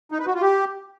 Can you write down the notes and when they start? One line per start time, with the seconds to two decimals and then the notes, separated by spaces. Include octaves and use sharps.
0.12 D#4
0.19 B4
0.27 F#4
0.34 F4
0.42 G4